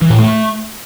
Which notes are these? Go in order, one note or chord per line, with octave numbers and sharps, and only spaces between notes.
E3
A2
A3